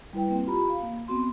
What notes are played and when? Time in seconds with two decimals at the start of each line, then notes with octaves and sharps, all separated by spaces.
0.13 G3 E4 B4 G5
0.28 A#3 C4
0.47 F4 G4 A#5 B5
0.70 F5
0.83 A#3
1.08 B3 C4 F#4 C6